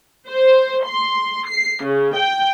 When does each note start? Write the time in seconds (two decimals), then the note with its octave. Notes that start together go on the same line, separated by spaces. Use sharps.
0.28 C5
0.86 C6
1.47 C7
1.83 C#3
2.14 G5